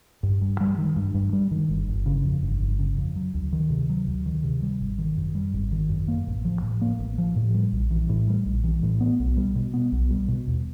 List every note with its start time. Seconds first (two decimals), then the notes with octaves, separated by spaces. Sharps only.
0.23 G2
0.42 G2
0.61 G3
0.78 D#3
0.96 G2
1.14 G2
1.33 G3
1.51 D#3
1.69 G1
1.88 G1
2.06 C#3
2.25 F2
2.42 G1
2.61 G1
2.79 C#3
2.97 F2
3.16 F#3
3.34 D2
3.53 D#3
3.70 C3
3.89 F#3
4.07 D2
4.26 D#3
4.44 C3
4.62 G3
4.80 G#1
4.98 D#3
5.17 F#2
5.35 G3
5.54 G#1
5.72 D#3
5.89 F#2
6.08 A#3
6.27 A1
6.45 F3
6.63 A2
6.81 A#3
6.99 A1
7.18 F3
7.36 A2
7.54 G3
7.72 A#1
7.91 E3
8.09 A2
8.28 G3
8.46 A#1
8.64 E3
8.83 A2
9.00 B3
9.19 B1
9.37 G3
9.56 B2
9.74 B3
9.92 B1
10.10 G3
10.28 B2
10.47 D#2